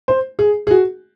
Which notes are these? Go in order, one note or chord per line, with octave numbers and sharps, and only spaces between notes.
C5
G#4
G#4
F#4